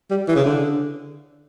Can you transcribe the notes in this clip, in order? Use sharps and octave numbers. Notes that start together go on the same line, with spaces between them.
G3
E3
C#3
D3